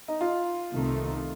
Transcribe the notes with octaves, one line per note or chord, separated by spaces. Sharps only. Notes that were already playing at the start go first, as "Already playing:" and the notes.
D#4
F4
C2 C3 D#3 A3 D#4